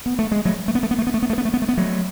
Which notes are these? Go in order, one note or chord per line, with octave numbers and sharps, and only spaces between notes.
B3
A3
G#3
F#3 A3
A3
B3
A3
B3
A3
B3
A3
B3
A3
B3
A3
B3
A3
B3
F#3 A3